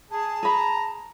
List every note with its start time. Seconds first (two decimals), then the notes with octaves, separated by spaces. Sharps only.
0.11 G#4 A5
0.43 G#4 A#5 B5